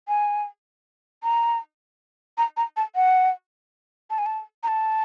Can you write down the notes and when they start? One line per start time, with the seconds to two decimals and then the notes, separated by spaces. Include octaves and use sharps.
0.08 G#5
1.23 A#5
2.38 A#5
2.57 A#5
2.77 A5
2.95 F#5
4.10 A5
4.18 G#5
4.26 A5
4.63 A#5
4.68 A5